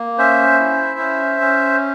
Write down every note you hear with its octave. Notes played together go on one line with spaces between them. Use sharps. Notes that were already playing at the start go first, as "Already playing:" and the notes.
Already playing: A#3
C#4 C5 E5
E4
C#4
C#4